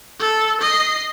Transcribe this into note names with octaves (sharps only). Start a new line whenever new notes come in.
A4 E6
D#5 C7